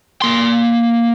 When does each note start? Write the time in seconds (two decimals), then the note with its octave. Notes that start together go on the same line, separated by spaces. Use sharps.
0.22 A#3 C6